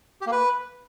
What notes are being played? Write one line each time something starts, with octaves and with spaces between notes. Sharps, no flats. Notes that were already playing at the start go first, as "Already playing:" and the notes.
G4
A#3
B4